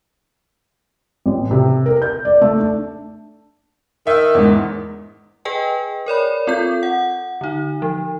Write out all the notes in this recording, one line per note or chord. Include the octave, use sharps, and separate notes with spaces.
A1
C3
A#4
G6
D5
A3
D4
D#3 E5
E2 G#2
G#4 B4 D#5 G5 G#5
A#4 C#5 D5 B5
C4 F4 A4 G6
F#5
D3 D#4
F3